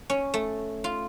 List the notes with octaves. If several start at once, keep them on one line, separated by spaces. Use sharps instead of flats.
C#4
A3
F4